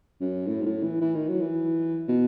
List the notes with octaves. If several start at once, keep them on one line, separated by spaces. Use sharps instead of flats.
F#2
A2
G#2
A2
E3
E3
D#3
F#3
E3
B2